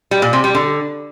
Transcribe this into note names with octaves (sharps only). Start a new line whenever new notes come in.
G3
A#2
C3
G3
D3